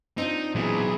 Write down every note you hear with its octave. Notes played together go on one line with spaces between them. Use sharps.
C4 D4 D#4 F4
A#2 E3 F#3 B3 E4 G#4